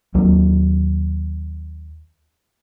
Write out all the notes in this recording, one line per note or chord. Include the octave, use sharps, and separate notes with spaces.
D#2 F#3